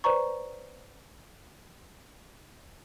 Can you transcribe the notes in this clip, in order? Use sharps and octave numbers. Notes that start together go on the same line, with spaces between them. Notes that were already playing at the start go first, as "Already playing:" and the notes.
B4 C5 D5 A#5 C#6